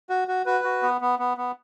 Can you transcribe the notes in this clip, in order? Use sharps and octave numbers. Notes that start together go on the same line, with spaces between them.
F#4
F#4
F#4 B4
F#4
B3
B3
B3
B3